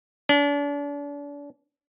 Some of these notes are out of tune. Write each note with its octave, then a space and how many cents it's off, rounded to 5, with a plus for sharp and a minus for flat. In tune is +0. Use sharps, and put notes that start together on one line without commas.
D4 -40